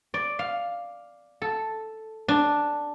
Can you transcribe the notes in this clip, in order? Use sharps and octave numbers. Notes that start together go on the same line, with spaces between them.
D5
F5
A4
D4